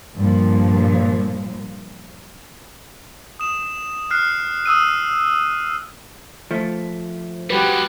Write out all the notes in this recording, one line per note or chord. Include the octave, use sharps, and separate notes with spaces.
G2 A#2 F3
D#6 E7
F6 F#6 C7
D#6 E6 D#7
F3 A3
G3 G#3 F#4 G4 B4